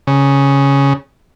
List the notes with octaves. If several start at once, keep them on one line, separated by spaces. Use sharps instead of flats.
C#3